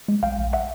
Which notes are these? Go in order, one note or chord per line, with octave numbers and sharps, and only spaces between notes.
G#3
A#1 F5 G5
A#1
E5 F#5